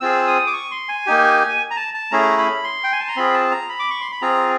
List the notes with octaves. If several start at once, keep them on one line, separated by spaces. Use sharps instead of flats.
C4 F4 G#4 E6
D#6
D6
C#6
C6
G#5
A#3 D#4 G4
A#5
A5
A5
A3 C#4 E4 G#4 A#5
B5
C6
G5
G#5
A5
A#5
C4 F4 G#4 B5
A5
A#5
B5
D6
C#6
C6
B5
C4 F4 G#4 A#5